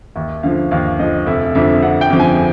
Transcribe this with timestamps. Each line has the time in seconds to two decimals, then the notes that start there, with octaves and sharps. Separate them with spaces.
0.15 D#2 E5
0.43 D3 F3 F5
0.71 D#2 F5
0.98 D3 F3 D#5
1.27 F1 E5
1.55 F2 D3 F3 E5
1.82 F1 F#5
2.01 G5
2.10 F2 D3 F3
2.20 G#5